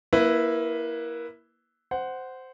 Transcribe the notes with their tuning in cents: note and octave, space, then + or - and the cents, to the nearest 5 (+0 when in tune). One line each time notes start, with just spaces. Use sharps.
A#3 +20 E4 +0 B4 +0
C5 -10 F#5 +5